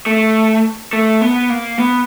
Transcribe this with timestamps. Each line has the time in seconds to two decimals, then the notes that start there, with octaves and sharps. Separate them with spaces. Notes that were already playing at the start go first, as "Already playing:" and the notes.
0.06 A3
0.93 A3
1.21 B3
1.50 A#3
1.79 B3